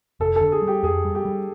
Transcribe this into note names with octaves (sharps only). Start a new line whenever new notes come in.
F1 A4
A4
D3
G#4
G3
G4
F2 G#4
G3
G4
G3